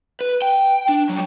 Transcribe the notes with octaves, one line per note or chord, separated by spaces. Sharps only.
B4
G5
D4
F#3 G3